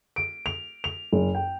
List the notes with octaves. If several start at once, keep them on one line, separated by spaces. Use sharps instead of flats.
D7
F7
F7
F#1
G5